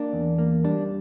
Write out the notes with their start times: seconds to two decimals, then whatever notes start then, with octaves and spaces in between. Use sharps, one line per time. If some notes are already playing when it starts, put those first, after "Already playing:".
Already playing: A#3 D4
0.13 E2
0.38 A#3
0.64 G3 D4